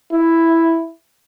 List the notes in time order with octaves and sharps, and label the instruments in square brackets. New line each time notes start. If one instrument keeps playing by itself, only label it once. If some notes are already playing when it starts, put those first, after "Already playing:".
[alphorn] E4